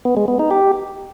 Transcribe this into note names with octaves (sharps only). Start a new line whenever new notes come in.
B3
G#3
B3
D#4
G4